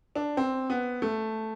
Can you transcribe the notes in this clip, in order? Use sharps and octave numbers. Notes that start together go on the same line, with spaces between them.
D4
C4
B3
A3